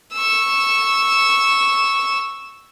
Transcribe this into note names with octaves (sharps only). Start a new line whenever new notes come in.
C#6 E6